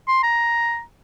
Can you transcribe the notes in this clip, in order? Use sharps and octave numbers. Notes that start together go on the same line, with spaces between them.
C6
A#5